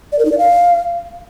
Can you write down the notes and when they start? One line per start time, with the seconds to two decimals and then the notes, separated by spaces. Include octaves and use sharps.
0.12 D5
0.19 A#4
0.25 D#4
0.32 D5
0.38 F5